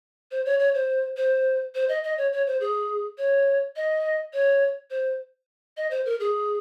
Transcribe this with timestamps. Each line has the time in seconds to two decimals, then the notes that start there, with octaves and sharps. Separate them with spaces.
0.31 C5
0.45 C#5
0.59 C#5
0.74 C5
1.17 C5
1.75 C5
1.89 D#5
2.03 D#5
2.18 C#5
2.33 C#5
2.47 C5
2.61 G#4
3.18 C#5
3.76 D#5
4.33 C#5
4.91 C5
5.77 D#5
5.91 C5
6.06 A#4
6.20 G#4